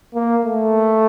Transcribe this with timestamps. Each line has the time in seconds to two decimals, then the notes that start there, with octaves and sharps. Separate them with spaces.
0.14 A#3
0.45 A3